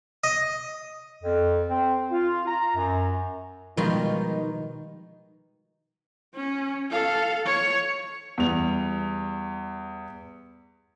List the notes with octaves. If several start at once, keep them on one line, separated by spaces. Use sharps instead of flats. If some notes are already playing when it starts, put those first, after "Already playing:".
D#5
F2
C4
F4
A#5
F#2
B2 D#3 F3 G3 G#3 D#4 F4
C#4
A4 F5
C#5
E2 G3 F7